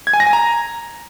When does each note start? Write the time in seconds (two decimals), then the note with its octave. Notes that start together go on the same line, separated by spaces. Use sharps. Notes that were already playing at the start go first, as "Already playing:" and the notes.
0.07 G#6
0.13 G#5
0.20 A#6
0.27 G#5
0.33 A#5